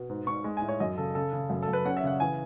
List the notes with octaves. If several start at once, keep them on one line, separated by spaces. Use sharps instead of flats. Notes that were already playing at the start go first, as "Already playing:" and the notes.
Already playing: B2
G#2
G#2 C#6
G#3
A2 G#5
C#5
F#2 D#5
C#3 A4
C#3 A4
C#3
F#2
A4
F#2
B4
C#4 F#5
E5
C#3 F#5
E3 G#5